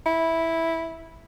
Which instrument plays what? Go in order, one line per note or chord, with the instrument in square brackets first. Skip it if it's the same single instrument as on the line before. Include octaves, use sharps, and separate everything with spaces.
[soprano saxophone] E4